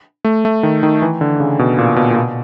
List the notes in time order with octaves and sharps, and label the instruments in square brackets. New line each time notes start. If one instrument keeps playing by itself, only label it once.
[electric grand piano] A3
A3
D#3
D#3
E3
D3
C#3
B2
A#2
B2
A#2
B2